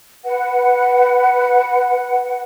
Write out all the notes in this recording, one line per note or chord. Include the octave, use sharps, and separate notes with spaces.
B4 F#5